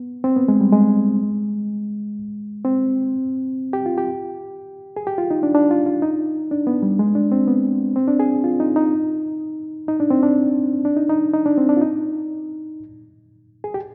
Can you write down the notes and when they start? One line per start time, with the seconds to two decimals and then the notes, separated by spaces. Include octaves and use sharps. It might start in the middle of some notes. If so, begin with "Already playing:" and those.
Already playing: B3
0.24 C4
0.36 B3
0.48 G#3
0.61 G3
0.72 G#3
2.65 C4
3.73 G4
3.86 F4
3.98 G4
4.97 G#4
5.07 G4
5.18 F4
5.31 D#4
5.43 D4
5.55 D4
5.71 F4
5.86 F4
6.02 D#4
6.51 D4
6.67 B3
6.82 G3
6.99 G#3
7.15 D4
7.32 C4
7.47 B3
7.96 C4
8.08 D4
8.20 G#4
8.44 F4
8.60 D#4
8.76 D#4
9.88 D#4
10.00 D4
10.10 C4
10.23 D4
10.85 D4
10.97 D#4
11.09 D#4
11.34 D#4
11.46 D4
11.58 C4
11.69 D4
11.77 F4
11.81 D#4
13.64 G#4
13.74 G4